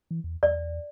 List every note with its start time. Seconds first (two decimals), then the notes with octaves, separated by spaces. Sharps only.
0.11 E3
0.24 E2
0.43 E2 D5